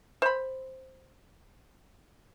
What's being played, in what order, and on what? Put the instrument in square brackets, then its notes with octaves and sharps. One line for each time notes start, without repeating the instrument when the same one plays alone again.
[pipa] C5 B5